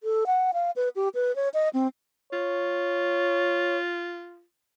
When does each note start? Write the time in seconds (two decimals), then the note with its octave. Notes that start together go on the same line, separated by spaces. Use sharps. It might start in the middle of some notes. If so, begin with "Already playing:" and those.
0.03 A4
0.27 F#5
0.53 F5
0.76 B4
0.96 G4
1.15 B4
1.36 C#5
1.54 D#5
1.73 C4
2.33 F4 C#5